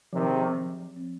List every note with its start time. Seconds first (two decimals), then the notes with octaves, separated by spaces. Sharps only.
0.13 C3 D#3 F3
0.29 G#4
0.46 C4
0.63 F3
0.79 F3
0.96 C4